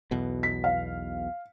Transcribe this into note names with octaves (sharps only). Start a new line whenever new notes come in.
B1 E2 B2
B6
F5